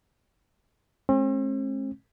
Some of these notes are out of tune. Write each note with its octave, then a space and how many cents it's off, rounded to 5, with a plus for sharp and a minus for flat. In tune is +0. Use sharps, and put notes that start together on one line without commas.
G#3 +40 C4 +45